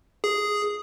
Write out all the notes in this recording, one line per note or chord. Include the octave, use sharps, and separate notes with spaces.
G#4